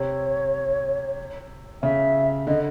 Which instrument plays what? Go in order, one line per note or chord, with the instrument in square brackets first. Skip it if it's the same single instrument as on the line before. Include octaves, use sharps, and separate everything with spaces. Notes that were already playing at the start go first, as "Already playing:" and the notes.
Already playing: [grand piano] C3 [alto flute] C#5
[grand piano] C#3 [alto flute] E5
[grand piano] D3 [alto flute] D#5